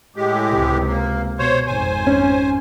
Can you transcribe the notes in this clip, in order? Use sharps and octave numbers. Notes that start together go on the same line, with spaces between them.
A2 G#3 G4
C#2 C3
A#3
B2 C5 C#5
G#1 F2 C5 G#5
C#4